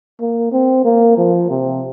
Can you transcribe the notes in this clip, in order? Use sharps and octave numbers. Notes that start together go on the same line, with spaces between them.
A#3
C4
A#3
F3
C3